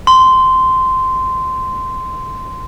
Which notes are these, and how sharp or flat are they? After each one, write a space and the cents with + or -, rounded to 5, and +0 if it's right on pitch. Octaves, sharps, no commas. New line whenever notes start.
C6 -10